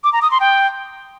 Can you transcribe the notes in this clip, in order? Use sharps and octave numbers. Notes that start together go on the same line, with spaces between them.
D6
A#5
D#6
C6
G5